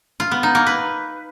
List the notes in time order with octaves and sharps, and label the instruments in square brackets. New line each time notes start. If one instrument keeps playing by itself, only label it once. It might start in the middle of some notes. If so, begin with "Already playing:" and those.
[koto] F4
B3
D#4
A#3
B4